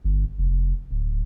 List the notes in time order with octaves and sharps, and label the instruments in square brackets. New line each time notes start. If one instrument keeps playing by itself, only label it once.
[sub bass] G1
F1
D1